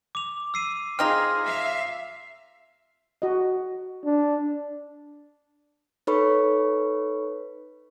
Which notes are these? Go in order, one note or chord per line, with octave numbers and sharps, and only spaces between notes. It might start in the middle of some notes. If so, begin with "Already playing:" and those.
D6 F7
E6 C7 D#7
C4 D#4 F4 G#4 F6 A#6 F7
E5 F5
F#4 D#5
D4
D#4 A4 B4 C#5 B5 C#6